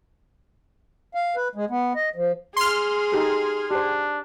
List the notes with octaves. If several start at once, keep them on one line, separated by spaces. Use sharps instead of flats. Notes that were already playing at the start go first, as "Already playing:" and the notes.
F5
B4
G#3
B3
D#5
F3
G#4 C6 F6
D#4 G4 A4
D4 G4 C5